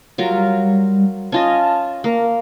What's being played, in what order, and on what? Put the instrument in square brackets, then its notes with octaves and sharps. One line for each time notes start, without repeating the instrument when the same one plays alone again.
[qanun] F#3 F4 A#4 [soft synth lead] G3
[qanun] C#4 F4 D#5 [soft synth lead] A5
[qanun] A#3 [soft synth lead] A#4